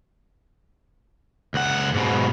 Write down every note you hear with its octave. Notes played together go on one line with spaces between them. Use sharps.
C#2 F#5
G#2 B2